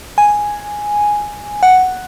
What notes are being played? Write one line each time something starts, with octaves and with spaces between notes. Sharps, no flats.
G#5
F#5